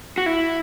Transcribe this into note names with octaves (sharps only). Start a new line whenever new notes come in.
F#4
E4